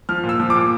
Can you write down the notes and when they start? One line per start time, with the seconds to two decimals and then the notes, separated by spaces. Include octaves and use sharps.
0.09 F3 F6
0.23 A#2
0.29 E6
0.40 F3
0.50 D6
0.55 A#2